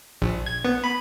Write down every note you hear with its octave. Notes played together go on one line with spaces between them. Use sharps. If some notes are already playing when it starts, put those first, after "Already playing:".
A#1
G#6
B3
B5